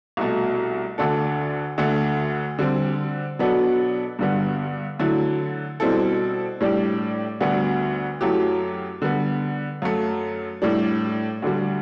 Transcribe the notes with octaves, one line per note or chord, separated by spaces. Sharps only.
C2 B2 A3
D2 D3 A3 D4 A4
D2 D3 A3
D3 G3 C4
B2 F#3 B3 D4 A4
G2 D3 G3 B3
D3 F#3 A3 E4
B2 G3 C4 E4 A4
A2 G3 D4 G4
D2 D3 G3 B3 F#4
F#2 F#3 A3 E4 G4
D3 G3 B3
F#2 F#3 A3
A2 G3 D4
D2 D3 G3